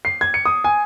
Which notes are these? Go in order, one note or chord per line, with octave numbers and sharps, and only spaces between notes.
C7
G#6
C#7
D#6
G#5